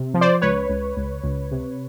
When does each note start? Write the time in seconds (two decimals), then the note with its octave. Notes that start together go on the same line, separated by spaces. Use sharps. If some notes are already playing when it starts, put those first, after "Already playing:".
Already playing: C3
0.14 F3
0.21 C5 D5
0.42 C#2 B4 C#5
0.69 C#2
0.97 C#2
1.24 C#2
1.51 C3